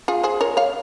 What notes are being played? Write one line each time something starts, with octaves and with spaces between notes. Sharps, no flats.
F4 G#4
G#4 C5
A#4 C#5
C#5 F5